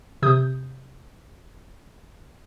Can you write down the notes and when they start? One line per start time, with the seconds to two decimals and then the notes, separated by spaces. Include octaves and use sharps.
0.22 C3 D#6 G6